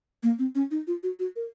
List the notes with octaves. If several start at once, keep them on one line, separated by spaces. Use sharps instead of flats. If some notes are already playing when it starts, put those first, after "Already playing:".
A#3
C4
C#4
D#4
F4
F#4
F#4
A#4